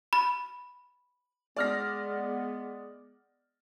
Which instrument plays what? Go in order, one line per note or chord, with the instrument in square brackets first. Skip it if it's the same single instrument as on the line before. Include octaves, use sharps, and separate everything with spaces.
[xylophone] B5
[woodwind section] G#3 B3 [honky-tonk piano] D5 F6 A#6